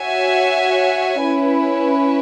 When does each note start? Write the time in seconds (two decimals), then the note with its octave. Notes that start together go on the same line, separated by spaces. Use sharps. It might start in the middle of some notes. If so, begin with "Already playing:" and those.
Already playing: F#4 C#5 E5 G#5
1.23 C#4 E4 B4